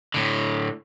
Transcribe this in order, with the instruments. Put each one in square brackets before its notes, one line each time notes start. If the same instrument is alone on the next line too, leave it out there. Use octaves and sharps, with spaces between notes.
[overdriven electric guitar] A2 D3